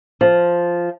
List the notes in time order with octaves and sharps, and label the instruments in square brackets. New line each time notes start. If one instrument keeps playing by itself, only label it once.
[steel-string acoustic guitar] F3